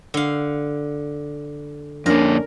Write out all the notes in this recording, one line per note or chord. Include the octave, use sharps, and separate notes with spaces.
D3 F5
F2 A#3 C#4 D4 A#4